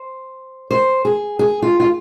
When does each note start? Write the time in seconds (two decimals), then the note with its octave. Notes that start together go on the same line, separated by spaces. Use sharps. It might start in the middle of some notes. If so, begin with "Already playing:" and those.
Already playing: C5
0.71 C5
1.05 G#4
1.39 G#4
1.62 F4
1.80 F4